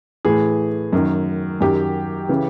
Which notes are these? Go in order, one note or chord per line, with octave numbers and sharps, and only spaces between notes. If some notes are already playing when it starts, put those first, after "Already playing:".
A2 E3 G#4
F#2 D#3
F#2 D#3 G4
C#3 E3